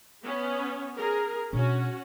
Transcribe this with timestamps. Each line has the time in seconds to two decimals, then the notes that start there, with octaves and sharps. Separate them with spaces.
0.23 B3 C#4
0.96 G#4 A#4
1.53 B2 C#4 D4 F#4